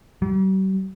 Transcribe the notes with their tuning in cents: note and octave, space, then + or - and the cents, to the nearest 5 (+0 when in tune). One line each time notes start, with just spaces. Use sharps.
G3 -45